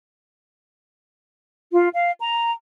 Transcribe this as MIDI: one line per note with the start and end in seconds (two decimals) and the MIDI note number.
1.72 1.88 65
1.94 2.10 77
2.20 2.52 82